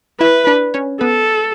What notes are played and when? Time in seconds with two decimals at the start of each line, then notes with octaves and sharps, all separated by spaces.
0.20 E4 B4 E5
0.47 D4 D5
0.74 C#4 C#5
1.01 B3 A4 B4